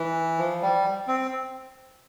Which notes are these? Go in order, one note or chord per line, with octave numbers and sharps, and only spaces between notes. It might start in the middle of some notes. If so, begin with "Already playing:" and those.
Already playing: E3
F3
G3
C4